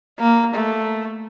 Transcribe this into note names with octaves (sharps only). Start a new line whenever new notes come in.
A#3
A3